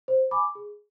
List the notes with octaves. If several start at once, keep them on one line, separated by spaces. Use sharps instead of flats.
C5
G#5 B5 D6
G#4